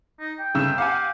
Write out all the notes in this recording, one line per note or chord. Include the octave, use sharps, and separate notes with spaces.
D#4
G5
G1 C#3 E6
G4 F5 F#5 G#5